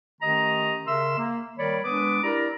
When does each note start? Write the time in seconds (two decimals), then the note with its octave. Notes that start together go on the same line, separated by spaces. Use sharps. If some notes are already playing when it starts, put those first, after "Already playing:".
0.21 D#3 A3 C#4 G4 D#5 A#5
0.86 C#3 A#4 E5 C6 E6
1.18 A#3
1.57 D#3 G3 A#4 C#5 D5 B5
1.84 G#3 B3 D4 B4 D6 D#6
2.23 D4 E4 G4 A#4 D5 A#5